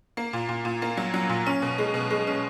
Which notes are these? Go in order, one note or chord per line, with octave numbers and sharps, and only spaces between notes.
A#3
A#2
A#2
A#2
A#3
F#3
F#3
A#2
C#4
B2
G#3
B2
G#3
C#4